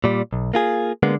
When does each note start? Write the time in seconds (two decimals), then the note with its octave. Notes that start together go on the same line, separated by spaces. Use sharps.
0.04 A#2 G3
0.33 B1
0.54 A#3 F4 G#4
1.03 D3 G#3 A#3 B3